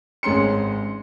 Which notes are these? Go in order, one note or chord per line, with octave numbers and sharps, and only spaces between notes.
G#1 G#3 C#4 C6 C#7